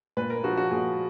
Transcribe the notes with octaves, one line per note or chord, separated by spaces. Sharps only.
A#2 B4
A#4
F3 F#4
F#4
A#2 G#4